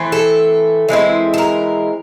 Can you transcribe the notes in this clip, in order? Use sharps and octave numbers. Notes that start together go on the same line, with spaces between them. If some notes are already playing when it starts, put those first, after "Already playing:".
Already playing: E3 A3 C4
A4
E3 G#3 C4 E4
A4
A#4